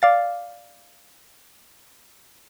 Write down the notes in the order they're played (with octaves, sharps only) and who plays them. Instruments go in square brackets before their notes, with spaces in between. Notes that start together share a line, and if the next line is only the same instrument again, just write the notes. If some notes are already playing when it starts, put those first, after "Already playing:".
[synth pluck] D5 F5 A6